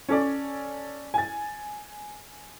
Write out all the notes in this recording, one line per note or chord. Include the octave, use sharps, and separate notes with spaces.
C#4 A4 D5
G#5 A6